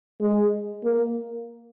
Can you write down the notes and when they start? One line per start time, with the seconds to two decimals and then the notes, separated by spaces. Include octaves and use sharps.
0.21 G#3
0.84 A#3